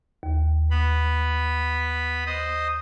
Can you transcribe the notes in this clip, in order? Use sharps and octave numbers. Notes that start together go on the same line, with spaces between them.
D#2
B3 B5
C5 D#5 D#6